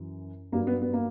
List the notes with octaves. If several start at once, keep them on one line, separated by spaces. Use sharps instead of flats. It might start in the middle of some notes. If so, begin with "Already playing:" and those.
Already playing: F#2 E3
G2 F#3 A#3
B3
B3
A#3